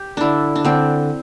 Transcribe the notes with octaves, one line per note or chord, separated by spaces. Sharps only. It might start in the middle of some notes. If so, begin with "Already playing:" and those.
Already playing: G4
D3 D4 E4
D4
D3 C4